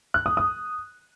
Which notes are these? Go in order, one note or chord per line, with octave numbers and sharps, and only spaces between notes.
F#6
D#6
D#6